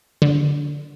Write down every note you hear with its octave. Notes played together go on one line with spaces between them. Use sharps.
D3